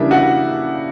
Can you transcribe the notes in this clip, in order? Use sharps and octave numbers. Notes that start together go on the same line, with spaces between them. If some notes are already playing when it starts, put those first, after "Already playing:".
Already playing: C#3 E3 G3 A#3 D4 E5
F#4 F#5